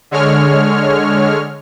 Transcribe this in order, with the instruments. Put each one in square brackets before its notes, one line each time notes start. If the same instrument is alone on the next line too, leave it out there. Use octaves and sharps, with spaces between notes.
[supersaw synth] D3 G#3 C#5 F6